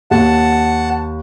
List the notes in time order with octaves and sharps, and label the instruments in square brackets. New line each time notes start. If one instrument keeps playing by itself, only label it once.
[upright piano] D#2 [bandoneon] F#5 A5